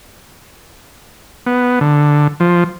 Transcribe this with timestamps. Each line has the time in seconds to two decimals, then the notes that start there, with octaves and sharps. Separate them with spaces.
1.46 B3
1.81 D3
2.40 F3